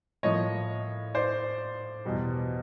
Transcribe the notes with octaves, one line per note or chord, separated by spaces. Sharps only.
A2 F3 A#3 C#5 D#5
C5 D5
E2 B2 G3